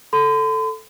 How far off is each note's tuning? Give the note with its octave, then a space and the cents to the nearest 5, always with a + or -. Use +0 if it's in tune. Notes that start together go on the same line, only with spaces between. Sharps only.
A4 +0 C6 -45